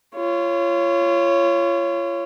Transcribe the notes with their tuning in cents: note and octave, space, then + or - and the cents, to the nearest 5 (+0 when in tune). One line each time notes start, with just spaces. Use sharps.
F4 -30 C#5 +0